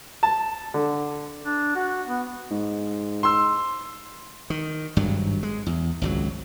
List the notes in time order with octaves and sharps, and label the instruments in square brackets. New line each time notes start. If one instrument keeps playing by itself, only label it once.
[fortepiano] A5
D3
[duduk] D4
F#4
B3
[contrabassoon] G#2
[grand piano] C6 E6
[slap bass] D#3
G#1 G2 F#3
G#3
E2
G#1 C#2 F#3